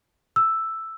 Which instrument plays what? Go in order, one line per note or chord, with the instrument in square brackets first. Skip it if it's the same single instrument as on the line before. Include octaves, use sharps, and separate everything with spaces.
[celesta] E6